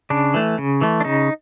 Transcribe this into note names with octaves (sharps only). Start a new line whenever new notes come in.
C#3 D4
E3 A3
C#3
E3 A3
D4
C#3 D#4